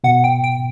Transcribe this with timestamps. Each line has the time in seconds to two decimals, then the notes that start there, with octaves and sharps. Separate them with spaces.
0.04 B2 F#5
0.24 G5
0.44 G5